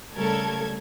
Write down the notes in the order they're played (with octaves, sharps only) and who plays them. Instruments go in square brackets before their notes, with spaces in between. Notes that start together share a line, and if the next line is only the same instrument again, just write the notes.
[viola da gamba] C#3 A3 A#4 [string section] G3 A4 G#6